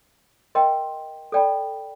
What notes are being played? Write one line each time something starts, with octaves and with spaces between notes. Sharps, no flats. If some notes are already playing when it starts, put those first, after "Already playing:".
A#4 D#5 G5 C6
A4 D5 G5 B5